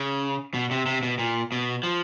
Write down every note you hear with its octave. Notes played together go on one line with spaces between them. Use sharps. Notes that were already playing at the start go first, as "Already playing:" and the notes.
Already playing: C#3
B2
C3
C3
B2
A#2
B2
F3